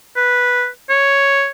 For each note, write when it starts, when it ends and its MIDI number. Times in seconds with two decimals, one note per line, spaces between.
0.16 0.67 71
0.90 1.49 73